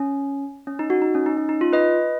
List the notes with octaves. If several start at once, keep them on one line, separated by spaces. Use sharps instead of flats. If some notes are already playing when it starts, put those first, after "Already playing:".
Already playing: C#4
C#4
D#4
F#4
D#4
C#4
D#4
C#4
D#4
F4
B4 D#5